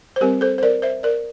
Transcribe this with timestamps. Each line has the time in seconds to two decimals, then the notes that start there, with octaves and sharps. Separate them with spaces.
0.16 C5
0.21 G3 C4 G4 A#4
0.41 A4 C5
0.58 C5
0.63 A#4 D5
0.82 C5 E5
1.03 A#4 D5